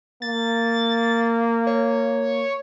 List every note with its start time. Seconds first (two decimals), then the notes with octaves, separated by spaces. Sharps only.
0.22 A#3 A6
1.67 C#5